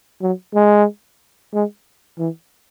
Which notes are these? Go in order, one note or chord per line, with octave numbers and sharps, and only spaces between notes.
F#3
G#3
G#3
E3